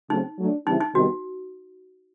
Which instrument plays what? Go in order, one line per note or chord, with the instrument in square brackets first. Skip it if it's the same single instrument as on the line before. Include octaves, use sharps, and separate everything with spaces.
[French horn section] C#3 F#3 A3 C4 [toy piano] D#4
[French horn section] F#3 A3 D4
[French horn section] C#3 E3 G3 C4 E4 [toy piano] D#4
[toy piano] D#4
[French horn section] C3 D#3 G3 B3 [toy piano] F#4